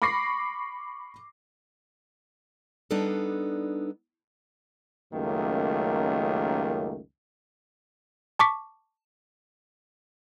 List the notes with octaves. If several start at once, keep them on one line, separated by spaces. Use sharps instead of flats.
B5 C#6 D6 A#6 C7
G3 B3 D4 D#4 A4
C#2 F#2 D#3 A3 A#3
A5 C#6 D6 B6